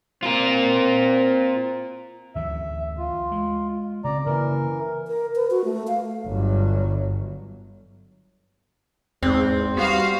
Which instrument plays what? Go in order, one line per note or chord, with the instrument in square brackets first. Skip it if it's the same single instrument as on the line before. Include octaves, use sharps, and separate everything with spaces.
[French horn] C4 [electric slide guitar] F4 A#4
[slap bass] D2 E3 F#3 [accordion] E5
[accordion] F4
[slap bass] G#3
[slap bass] C#3 C4 [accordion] D5 A#5
[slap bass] C#3 A#3 [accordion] E3 A#4
[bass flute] A#4
B4
F#4
A3
F5
[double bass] G1 F#3
[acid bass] E2 [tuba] G#2 [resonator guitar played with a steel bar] C4
[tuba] G3 [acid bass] B3 [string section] F#4 F5